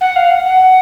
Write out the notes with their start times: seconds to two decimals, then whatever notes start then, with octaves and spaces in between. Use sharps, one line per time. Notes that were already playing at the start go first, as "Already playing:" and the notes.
0.01 F#5
0.16 F5
0.30 F#5
0.44 F#5